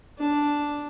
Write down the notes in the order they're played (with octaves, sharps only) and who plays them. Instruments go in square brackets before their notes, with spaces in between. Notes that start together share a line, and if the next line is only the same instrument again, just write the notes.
[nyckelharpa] D4